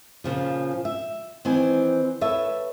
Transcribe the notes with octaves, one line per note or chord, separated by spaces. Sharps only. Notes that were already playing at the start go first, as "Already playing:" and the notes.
A#2 C#3 F3
E5
D#3 E3 C4 G#5
A4 B4 C#5 E5